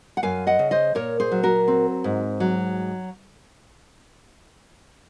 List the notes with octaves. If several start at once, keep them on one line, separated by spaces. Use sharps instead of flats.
F#5
F#2 F5 G#5
D#5 F#5
C#3
C5 D#5
A#2 A#4 C#5
G#4 C5
F#3
F#4 A#4
C4
G#2
F#3